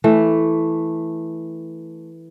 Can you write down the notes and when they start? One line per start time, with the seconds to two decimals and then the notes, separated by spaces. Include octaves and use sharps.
0.04 E3 A3